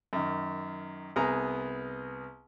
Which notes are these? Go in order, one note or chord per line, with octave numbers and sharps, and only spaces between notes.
F#2 D#3
C2 B3 G#4 A#5